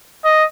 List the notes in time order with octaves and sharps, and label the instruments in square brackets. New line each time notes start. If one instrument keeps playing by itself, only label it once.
[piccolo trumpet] D#5